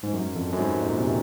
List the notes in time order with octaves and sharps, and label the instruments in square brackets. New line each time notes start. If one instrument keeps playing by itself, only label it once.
[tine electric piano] G#2
F#2
F2
F#2
G#2
A#2
C3